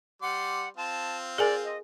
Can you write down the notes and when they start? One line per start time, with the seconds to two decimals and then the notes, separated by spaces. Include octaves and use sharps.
0.22 G3 F#5 C6 D6
0.77 C4 F4 A5
1.38 G#4 A#4 D5 G#5
1.64 D#5